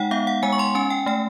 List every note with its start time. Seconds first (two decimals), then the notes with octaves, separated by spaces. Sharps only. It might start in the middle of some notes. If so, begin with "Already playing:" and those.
Already playing: G#3 D#4 F#5 G5
0.11 B3 F5
0.27 F#5
0.43 G#3 G#5
0.53 C#6
0.59 C6
0.75 C#4 G#5
0.90 G5
1.06 A3 G5